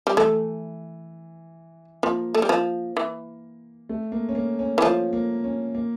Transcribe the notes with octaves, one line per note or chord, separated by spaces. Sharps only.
G3
E3 A3
F3 A#3
A3
G3
F3
E3
A3
A#3
C#4
A#3
C#4
E3
F3 C#4
A#3
C#4
A#3